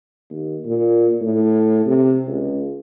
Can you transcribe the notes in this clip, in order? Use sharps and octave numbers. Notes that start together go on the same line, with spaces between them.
D#2
A#2
A2
C3
C#2